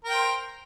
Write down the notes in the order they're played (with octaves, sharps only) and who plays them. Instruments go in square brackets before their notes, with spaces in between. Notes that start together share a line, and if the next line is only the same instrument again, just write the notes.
[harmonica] A#4
G5
C5